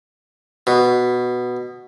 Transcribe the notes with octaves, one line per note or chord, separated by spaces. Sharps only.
B2